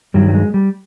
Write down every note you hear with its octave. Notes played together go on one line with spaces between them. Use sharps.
G2 D#3 F#3 G3
G3
G#3
G3